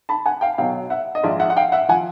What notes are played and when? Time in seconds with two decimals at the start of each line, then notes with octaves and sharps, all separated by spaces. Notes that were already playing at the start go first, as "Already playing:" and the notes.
0.09 A5 B5
0.26 F#5 G#5
0.41 F5 G5
0.58 B1 B2 F#3 F5 G5
0.90 E5 F#5
1.15 D#5
1.23 A#1 G#2 F3 D5 E5
1.40 E5 F#5
1.50 F#5
1.57 F5 G5
1.72 E5 F#5
1.89 F3 F#5 G#5